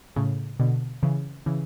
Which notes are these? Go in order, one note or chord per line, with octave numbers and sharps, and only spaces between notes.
A2 C#3
B2 D3
C#3 E3
C#3 E3